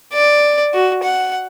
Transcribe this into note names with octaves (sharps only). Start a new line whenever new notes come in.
D5
F#4
F#5